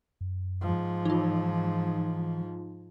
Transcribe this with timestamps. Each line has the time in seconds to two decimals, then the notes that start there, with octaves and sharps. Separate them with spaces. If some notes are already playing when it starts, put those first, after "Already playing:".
0.21 F#2
0.61 G#2 F3
1.05 E3 D#4 F4